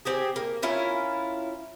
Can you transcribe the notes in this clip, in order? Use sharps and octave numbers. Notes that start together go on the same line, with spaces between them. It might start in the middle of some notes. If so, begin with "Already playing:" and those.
C4 G4 G#4
A#3
C#4 E4 F4 A#4